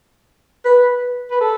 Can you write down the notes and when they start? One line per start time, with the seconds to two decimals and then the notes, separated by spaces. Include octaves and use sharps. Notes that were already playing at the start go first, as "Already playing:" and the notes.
0.65 B4
1.31 B4
1.41 A4